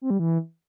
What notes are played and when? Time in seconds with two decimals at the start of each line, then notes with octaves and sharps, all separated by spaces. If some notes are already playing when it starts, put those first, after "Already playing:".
0.01 C4
0.10 G3
0.19 E3